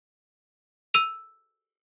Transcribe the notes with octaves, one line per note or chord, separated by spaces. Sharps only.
E6 D#7 F7